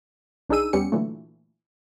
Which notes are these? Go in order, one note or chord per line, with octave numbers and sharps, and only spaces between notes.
B1 D4 D#4 G#4 E6 D#7
E2 G3 B3 C#4 G4 C#7
A#2 D3 E3 F#3 A3